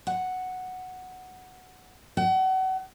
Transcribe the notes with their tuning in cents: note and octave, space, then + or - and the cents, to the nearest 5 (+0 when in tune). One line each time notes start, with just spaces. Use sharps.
F#5 +0
F#5 +35